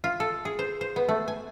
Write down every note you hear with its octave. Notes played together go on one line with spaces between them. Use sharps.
F4
A4
G#4
C5
C5
B3
A3
G#5